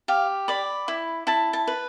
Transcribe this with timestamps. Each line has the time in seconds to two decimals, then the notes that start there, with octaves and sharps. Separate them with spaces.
0.08 G4 F5
0.48 D5 B5
0.88 E4
1.27 E4 A5
1.53 A5
1.67 B4